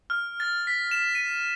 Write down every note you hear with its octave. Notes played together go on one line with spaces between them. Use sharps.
F6
A6
B6
E7
D#7